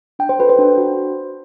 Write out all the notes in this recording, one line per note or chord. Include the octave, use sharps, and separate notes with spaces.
D4 G5
C5
F#4 A4 B4
C5
D4
F#4